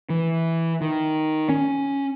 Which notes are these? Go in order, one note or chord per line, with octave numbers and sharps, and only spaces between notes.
E3
D#3
C#4